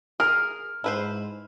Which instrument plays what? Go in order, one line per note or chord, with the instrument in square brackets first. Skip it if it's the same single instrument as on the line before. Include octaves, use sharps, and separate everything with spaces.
[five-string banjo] G#4 A#4 [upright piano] F6
[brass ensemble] G#2 [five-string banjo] E4 B4 C5